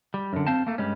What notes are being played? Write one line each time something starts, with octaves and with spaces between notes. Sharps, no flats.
G3
F#2 D3
C4 F5 G5 A5
A3 A#3
G2 G3 G#3 C#4